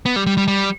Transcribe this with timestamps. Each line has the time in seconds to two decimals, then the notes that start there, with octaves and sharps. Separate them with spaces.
0.06 B3
0.16 G3
0.27 G3
0.38 G3
0.48 G3